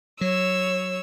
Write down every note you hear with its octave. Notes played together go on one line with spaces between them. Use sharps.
F#3 C#5 E6